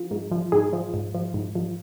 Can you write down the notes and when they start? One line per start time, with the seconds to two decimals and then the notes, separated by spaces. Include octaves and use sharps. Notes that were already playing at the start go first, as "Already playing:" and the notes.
Already playing: F3
0.11 G#2
0.32 F3
0.52 G#2 G#4
0.73 F3
0.94 G#2
1.15 F3
1.34 G#2
1.55 F3